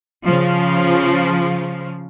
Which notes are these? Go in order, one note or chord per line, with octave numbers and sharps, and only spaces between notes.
C#3 F3